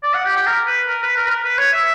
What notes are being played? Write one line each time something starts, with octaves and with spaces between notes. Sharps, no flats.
D5
F#5
G4
G4
A#4
B4
A#4
B4
A#4
B4
A#4
B4
C#5
E5